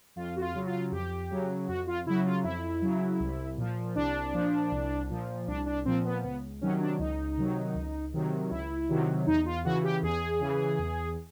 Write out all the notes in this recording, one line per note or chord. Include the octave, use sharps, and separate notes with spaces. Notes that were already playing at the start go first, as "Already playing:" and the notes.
F2 F4
F#4
F4
C#3 F#3
F#4
F4
F2 G4
C#3 F#3
F2 F#4
F4
C#3 F#3 E4
F4
F2 E4
C#3 F#3
C2
A#2 F3
C2 D4
A#2 F3
C2
A#2 F3
C2 D4
D4
A#2 F3 C4
B3
C#2 B3
C3 D#3 F#3 C#4
D4
C#2 D#4
C3 D#3 F#3
C#2
C3 D#3 F#3
C#2 E4
C3 D#3 F#3
E2 D#4
F4
C#3 E3 F#4
G4
E2 G#4
C#3 E3
E2